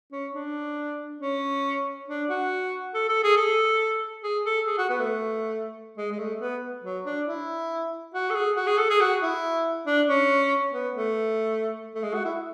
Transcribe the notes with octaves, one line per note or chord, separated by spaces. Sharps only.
C#4
D4
C#4
D4
F#4
A4
A4
G#4
A4
G#4
A4
G#4
F#4
B3
A3
G#3
G#3
A3
B3
F#3
D4
E4
F#4
A4
G#4
F#4
G#4
A4
G#4
F#4
E4
D4
C#4
B3
A3
A3
G#3
F#4
E4